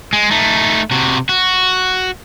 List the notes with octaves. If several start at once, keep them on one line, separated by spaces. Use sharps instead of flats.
G#3
A3 D#4
C3 F#4
F#4